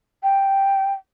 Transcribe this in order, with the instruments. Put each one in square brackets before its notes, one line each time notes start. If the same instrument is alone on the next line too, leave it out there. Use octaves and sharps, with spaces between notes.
[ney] G5